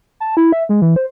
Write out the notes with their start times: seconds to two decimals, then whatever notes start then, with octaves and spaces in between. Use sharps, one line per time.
0.20 A5
0.37 E4
0.52 E5
0.69 G#3
0.82 E3
0.96 C5